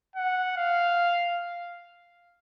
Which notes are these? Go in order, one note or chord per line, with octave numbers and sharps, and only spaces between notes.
F#5
F5